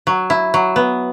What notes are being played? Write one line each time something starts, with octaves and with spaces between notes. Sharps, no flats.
F#3
E4
F#3
B3